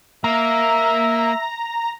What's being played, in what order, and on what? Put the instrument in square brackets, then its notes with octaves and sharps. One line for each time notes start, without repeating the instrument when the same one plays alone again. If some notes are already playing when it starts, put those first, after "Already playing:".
[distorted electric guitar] A#3 [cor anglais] E5 [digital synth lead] A#5